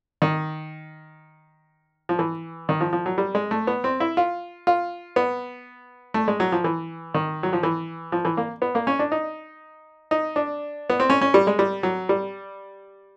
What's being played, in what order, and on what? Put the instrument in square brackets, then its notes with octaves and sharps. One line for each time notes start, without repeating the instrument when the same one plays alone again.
[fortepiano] D#3
F3
E3
D#3
F3
F3
F#3
G3
G#3
A3
B3
C4
E4
F4
F4
B3
A3
G#3
F#3
F3
E3
D#3
F#3
F3
E3
F3
E3
A#3
B3
A#3
C#4
D4
D#4
D#4
D4
B3
C4
C#4
C#4
G3
G#3
G3
F#3
G3